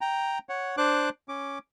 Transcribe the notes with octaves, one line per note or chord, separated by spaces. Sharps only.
G5 A#5
C#5 F#5
D4 C5 D6 F#6
C#4 D6